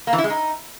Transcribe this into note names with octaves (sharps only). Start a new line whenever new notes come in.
A#3
E3
E4
G#3
D#4